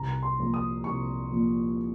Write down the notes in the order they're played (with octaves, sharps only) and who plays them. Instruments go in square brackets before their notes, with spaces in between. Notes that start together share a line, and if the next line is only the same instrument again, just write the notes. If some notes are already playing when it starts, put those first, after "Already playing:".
Already playing: [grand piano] C2 A#5
C6
A#2 F3 A#3
D#6
C2 C#6
A#2 F3 A#3